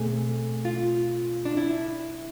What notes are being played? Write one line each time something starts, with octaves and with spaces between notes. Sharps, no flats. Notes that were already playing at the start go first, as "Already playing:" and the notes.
Already playing: B2 A3 C4 G#4
F4
D4
E4